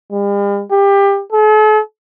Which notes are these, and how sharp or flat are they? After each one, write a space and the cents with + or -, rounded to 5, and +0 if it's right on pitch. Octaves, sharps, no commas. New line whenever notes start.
G3 +45
G4 +25
A4 -45